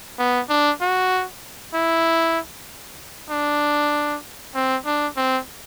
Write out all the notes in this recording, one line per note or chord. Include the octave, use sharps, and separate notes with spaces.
B3
D4
F#4
E4
D4
C4
D4
C4